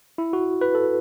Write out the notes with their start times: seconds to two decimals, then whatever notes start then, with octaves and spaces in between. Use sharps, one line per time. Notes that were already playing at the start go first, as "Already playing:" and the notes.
0.18 E4
0.33 F#4
0.61 B4
0.75 A4